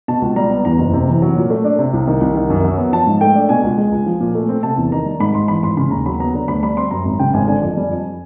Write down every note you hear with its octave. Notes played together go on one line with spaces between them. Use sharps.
B2 A5
C#2
G3 A#5
B3
E2 A#5
F#1
C3
E3
F#3
A#2
A3
D4
C3
C2
D#3
C2
D#3
F#2
F#3
B3
F3 A5
G#2
A3 G5
D4
B2 G#5
C#2
G#3
C#2
F3
A#2
A3
C4
C3 A5
E2
D#3 A#5
G3
G#2 B5
G#1 C6
E3 B5
G#1 C6
C#3 B5
D#2 A#5
F#3 B5
B3 A#5
D3
D2 B5
G3 B5
C4 C6
F#2 A#5
G#1
C#3 G5
G#1 G#5
D3 G#5
F2
G3
F2